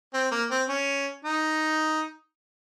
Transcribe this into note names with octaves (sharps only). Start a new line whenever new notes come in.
C4
A#3
C4
C#4
D#4